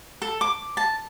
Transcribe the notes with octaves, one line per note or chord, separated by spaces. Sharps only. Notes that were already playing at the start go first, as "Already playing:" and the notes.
A4
D6
A5